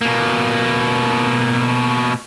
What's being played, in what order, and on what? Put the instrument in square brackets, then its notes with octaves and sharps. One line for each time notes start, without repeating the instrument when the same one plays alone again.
[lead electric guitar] B2 A#3